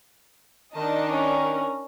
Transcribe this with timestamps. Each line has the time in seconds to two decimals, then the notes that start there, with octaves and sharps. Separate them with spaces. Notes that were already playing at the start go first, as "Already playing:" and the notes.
0.75 D#3 D4 D#4 D#5 A5
1.09 C#4 A#4